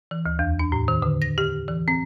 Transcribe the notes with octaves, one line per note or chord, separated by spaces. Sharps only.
E3
D2
E2
D4
A2
D#3
D3
A#6
G4
E3
C4